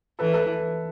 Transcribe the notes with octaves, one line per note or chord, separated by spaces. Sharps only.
E3 A4 B4
A4 B4